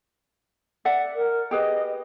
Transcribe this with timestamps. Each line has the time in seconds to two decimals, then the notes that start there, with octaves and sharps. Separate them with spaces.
0.85 D5 E5 F#5
1.15 A#4
1.51 G4 G#4 B4 D#5